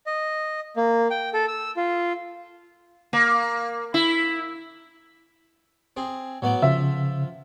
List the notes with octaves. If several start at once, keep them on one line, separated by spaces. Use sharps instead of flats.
D#5
A#3
G5
A4
E6
F4
A#3
E4
C4 G#4
A2 F#3 B3 D5
C#3 F3 E5